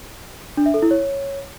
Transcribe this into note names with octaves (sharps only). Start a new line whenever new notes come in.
D4
E5
A4
E4
C#5